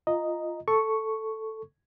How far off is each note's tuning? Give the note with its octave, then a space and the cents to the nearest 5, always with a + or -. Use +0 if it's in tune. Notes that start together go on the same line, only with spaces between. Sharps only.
F4 -10 D#5 +0 A#5 +0
A4 +0 C#6 +0